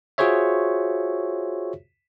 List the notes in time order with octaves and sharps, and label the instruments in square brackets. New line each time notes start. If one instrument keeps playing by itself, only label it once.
[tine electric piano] F4 F#4 G#4 C5 C#5 E5